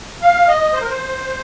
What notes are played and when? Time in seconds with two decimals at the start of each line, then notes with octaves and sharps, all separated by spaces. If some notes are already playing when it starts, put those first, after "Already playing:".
0.22 F5
0.48 D#5
0.73 C5
0.81 A#4
0.88 C5